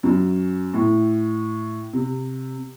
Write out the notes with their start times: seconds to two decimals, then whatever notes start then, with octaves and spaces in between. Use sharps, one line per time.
0.03 F#2
0.74 A2
1.93 C3